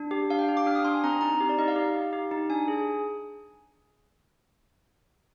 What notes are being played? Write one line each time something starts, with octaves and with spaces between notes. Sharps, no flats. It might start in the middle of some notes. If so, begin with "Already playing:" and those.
Already playing: D4
G4
D4 F5
G5
G4
D6
D4 F6
D#6
D4 C6
G#5
C4 A#5
D#4 A#5
G4
D5
D#4 D#5
F5
G4
D#4
G4
D#4
D4 G#5
G#4